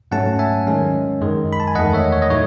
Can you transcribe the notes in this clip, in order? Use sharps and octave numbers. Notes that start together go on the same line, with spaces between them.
G#2 F#3 A3 C#4 F#5 A5
E5 G#5
D#3 G#3 C#4
F#2 D#3 G#3
B5
A5
G#5
E2 D#3 A3 D#5 F#5
C#5 E5
C#5
D#5
A2 F#3 A3 D#4 C#5